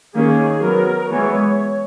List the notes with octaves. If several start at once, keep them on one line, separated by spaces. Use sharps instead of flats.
D#3 A#3 C#4 G#4
F#3 B3 A#4
E3 G#3 B3 C#5